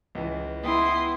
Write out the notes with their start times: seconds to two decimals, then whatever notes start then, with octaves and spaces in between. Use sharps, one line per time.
0.15 C#2 E3
0.64 B3 E4 G5 C6 D#6